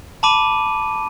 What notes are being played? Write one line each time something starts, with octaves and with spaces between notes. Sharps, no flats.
A5 B5 D6 D#7